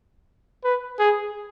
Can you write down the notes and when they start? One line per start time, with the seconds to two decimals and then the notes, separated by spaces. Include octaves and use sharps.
0.64 B4
0.99 G#4